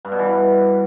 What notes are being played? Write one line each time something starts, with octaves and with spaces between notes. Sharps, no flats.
G2
B2
E3
G2